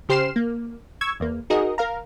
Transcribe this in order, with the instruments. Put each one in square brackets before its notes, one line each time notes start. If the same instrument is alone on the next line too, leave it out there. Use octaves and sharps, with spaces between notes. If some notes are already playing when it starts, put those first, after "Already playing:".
[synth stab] C#3 G4 C5 F6 C7 E7
A#3
C#6 E6 G#6
E2 A#3
D#4 F#4 G#4 A#4 D#5
A#4 F5 A#5